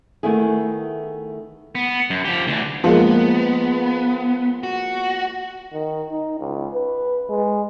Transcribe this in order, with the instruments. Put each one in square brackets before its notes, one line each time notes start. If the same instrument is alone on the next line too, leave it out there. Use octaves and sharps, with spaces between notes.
[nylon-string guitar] D#3 A3 B3 E4 G#4
[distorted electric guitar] B3
F#2
F3 G4
D2 E3
[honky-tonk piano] F3 G#3 A#3 [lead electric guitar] B3
[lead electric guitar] F#4
[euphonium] D#3
D#4
C#2
B4
G#3